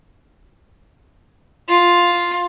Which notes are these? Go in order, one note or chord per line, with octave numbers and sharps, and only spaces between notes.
F4